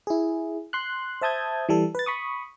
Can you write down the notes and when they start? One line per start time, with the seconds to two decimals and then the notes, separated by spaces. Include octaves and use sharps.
0.07 E4 G#4
0.73 C6 F#6
1.21 C5 E5 A5 D#6 G6 G#6
1.69 E3 G3 A4
1.95 B4 A6
2.06 B5 C#6 D#6